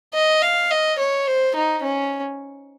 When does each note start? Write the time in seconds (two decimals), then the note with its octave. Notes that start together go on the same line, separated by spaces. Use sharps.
0.14 D#5
0.42 F5
0.71 D#5
0.98 C#5
1.27 C5
1.55 D#4
1.83 C#4